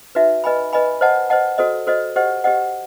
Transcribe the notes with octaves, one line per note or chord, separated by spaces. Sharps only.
D#4 F#4 B4 E5
B4 D#5 G#5 B5
B4 D#5 G#5 B5
C5 D#5 F#5 A5
C5 D#5 F#5 A5
F#4 A4 C5 D#5
F#4 A4 C5 D#5
G4 C5 D#5 F#5
G4 C5 D#5 F#5